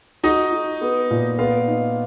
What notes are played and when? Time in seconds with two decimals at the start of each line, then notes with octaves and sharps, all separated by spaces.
0.23 D#4 F#4 D#5
0.52 F#4
0.81 B3
1.10 A#2
1.39 B3 F4 F5
1.67 D#4